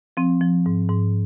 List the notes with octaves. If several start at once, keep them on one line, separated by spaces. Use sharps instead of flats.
F3 C4
F3
G#2
G#2